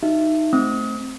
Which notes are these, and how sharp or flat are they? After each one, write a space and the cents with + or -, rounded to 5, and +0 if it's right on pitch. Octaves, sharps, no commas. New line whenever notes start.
D#4 +0 F#4 +30 E5 +15
A3 -5 C4 +0 D#6 +35